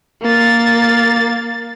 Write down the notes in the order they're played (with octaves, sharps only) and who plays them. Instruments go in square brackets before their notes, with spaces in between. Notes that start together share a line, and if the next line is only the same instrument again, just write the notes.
[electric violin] A#3 A6